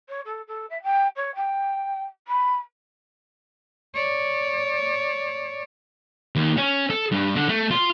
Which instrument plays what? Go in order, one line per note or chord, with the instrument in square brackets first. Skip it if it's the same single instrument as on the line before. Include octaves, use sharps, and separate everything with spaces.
[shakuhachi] C#5
A4
A4
E5
G5
C#5
G5
B5
[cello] C#5 D5
[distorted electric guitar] D#2
C#4
A4
G2
D3
A3
F4